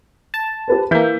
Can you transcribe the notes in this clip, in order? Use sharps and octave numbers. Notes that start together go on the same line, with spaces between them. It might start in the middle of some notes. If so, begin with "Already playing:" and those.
A5
G4 B4 C5
E3 A#3 E6 G6 B6